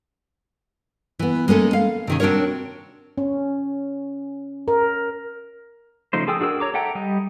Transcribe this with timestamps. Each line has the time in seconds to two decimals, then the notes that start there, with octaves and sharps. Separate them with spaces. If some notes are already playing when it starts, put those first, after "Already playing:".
1.19 E3 B3
1.48 G#3 A#3 C#4 A4
1.73 F5
2.07 C3 D#3 C#4
2.20 C4 D4 F#4 A#4 C#5
3.18 C#4
4.68 A#4
6.13 C#3 F3 A3 D#4 C5
6.28 G#4 A4 G5 D#6 E6
6.40 D4 F#4 G#4 A#4 E6
6.60 C#5 A#5 D6
6.74 A4 E5 F#5 G5 A#5
6.95 G3 D#5